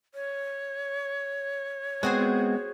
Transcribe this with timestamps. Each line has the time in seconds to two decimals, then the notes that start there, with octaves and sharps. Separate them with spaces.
0.14 C#5
2.03 G#3 B3 C4 F#4 G#4 C5